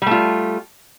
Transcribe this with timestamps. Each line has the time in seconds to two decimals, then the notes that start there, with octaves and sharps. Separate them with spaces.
0.02 G3
0.07 A3
0.11 F4